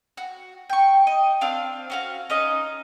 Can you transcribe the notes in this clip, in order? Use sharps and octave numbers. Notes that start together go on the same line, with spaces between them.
F#4
G5 C#6
D#5
C4 D4 F5
C#4 F#4 F5
C#4 D#4 D#5